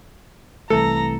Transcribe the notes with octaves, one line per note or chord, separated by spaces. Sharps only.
C2 E3 A3 A4 A#5